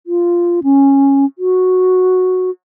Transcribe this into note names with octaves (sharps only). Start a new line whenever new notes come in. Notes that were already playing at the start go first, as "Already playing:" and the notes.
F4
C#4
F#4